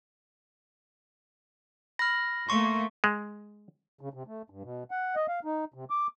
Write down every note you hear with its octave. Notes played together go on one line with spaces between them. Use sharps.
B5 F6 A#6
A3 A#3 C6 C#6
G#3
C#3
C3
A3
G2
B2
F#5
D#5
F5
D#4
C3
D6